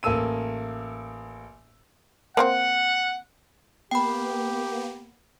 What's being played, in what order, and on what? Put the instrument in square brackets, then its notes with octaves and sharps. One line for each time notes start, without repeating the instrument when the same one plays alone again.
[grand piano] A1 A#3 A4 E6 D#7
[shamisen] A#3 C4 C5 [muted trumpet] F#5
[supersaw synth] A#3 B3 [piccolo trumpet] G4 [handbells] G5 B5